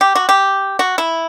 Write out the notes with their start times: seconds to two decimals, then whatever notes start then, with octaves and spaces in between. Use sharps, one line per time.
0.01 G4
0.15 F#4
0.29 G4
0.79 F#4
0.98 E4